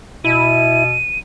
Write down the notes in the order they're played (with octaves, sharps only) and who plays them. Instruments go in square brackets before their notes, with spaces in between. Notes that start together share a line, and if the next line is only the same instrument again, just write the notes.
[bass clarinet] B2 [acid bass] E4 [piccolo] D#7